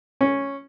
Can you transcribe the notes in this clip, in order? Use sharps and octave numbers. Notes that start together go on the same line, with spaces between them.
C#4